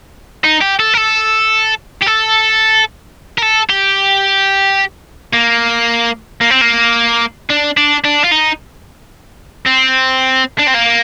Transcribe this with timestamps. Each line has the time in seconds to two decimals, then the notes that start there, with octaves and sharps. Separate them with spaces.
0.44 D#4
0.61 G4
0.80 A4
0.94 A#4
0.97 A4
2.03 G4
2.07 A4
3.38 A#4
3.42 A4
3.69 G4
5.33 A#3
6.41 A#3
6.51 C4
6.62 A#3
7.50 D4
7.77 D4
8.05 D4
8.24 F4
8.32 D#4
9.67 C4
10.59 D4
10.68 C4
10.75 A#3